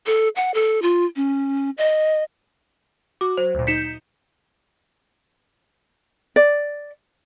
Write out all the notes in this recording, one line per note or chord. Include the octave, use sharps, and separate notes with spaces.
A4
F#5
A4
F4
C#4
D#5
F#4 D6
F#3 C5
D2 A#2
D#4 G6 B6 C#7 E7
D5